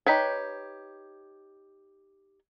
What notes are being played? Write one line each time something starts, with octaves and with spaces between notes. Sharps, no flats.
D#4 G4 B4 C#5